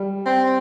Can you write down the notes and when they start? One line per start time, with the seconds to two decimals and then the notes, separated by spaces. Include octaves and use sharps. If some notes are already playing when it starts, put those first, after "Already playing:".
Already playing: G3
0.26 C4